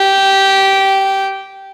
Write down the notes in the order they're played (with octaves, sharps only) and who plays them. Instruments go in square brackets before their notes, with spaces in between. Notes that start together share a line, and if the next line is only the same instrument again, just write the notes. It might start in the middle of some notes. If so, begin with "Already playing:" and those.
Already playing: [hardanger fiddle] G4